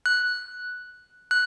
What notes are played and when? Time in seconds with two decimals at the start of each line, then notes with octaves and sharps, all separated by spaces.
0.06 F#6
1.31 F#6